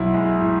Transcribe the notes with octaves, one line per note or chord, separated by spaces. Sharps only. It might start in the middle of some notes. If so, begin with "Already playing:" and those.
Already playing: B1 E4
G#3
A2